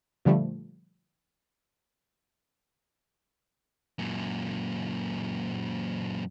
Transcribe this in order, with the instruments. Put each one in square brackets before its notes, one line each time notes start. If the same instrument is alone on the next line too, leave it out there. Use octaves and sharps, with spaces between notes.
[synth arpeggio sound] A#2 D3 F3 G3 A3
[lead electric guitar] F#2 A#2